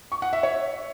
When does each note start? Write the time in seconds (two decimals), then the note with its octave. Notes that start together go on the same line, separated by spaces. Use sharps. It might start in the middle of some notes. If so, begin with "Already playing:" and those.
0.12 C#6
0.22 F#5
0.33 E5
0.43 C#5